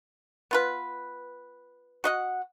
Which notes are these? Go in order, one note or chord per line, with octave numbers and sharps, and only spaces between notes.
B3 F4 B4
F#4 D#5 F#5